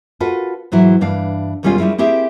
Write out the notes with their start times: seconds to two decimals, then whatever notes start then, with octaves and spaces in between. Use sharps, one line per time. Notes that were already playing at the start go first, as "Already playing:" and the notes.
0.20 F4 F#4 A4 B4
0.72 G#2 E3 F#3 E4
1.01 G2 E3 D4 F5
1.63 D#2 B2 G3 G#3 C#4 F4
1.78 G3 G#3 C#4 E4 F4
1.98 C4 E4 G4 G#4 E5